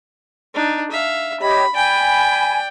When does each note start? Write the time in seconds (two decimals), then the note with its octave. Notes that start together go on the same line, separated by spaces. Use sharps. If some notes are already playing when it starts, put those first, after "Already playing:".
0.54 D4 D#4
0.91 E5 F5
1.40 G4 C#5 D#5 B5
1.75 D5 G5 G#5 B5